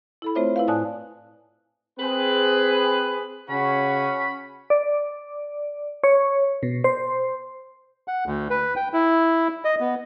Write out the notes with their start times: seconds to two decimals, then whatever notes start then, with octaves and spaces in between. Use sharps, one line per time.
0.22 E4 A4 B5
0.35 A3 C4 F4 C5 C#5 E5
0.56 E4 B4 F5
0.67 A2 D5 G#5 A5 D#6 F#6
2.00 C4 G#4 B4
3.50 C#3 C#4 F#4 B5
4.70 D5
6.04 C#5
6.63 B2
6.84 C5
8.08 F#5
8.26 D2
8.50 B4
8.76 G5
8.93 E4
9.64 D#5
9.80 B3